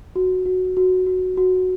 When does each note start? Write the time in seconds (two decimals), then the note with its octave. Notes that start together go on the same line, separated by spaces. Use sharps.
0.16 F#4
0.45 F#4
0.77 F#4
1.06 F#4
1.37 F#4